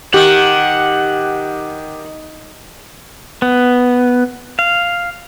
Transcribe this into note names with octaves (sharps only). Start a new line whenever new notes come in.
D#3 G4 F#5
B3
F5